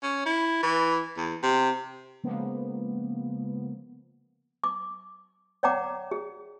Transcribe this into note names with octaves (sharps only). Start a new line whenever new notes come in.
C#4
E4
E3
E2
C3
C#3 F3 G#3 A#3 B3
D6
C#5 D5 F#5 G5 A#5 D6
G#4